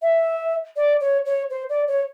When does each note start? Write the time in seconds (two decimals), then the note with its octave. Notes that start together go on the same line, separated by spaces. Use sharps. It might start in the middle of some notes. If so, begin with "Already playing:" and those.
0.02 E5
0.76 D5
1.00 C#5
1.25 C#5
1.50 C5
1.69 D5
1.87 C#5